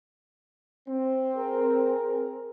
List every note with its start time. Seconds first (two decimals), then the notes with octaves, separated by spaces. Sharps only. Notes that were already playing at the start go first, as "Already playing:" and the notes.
0.87 C4
1.36 G#4 A#4